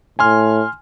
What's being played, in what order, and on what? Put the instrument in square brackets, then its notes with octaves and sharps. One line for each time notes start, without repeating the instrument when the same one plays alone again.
[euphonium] A2 [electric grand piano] G#5 C6 F6